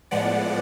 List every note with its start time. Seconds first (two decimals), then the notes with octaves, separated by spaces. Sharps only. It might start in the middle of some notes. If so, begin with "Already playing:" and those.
0.11 A2 F3 G#3 B3 D5 F#5